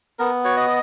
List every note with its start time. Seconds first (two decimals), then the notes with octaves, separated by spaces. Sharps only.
0.19 B3 A#4
0.45 F#4 C#5
0.57 D#5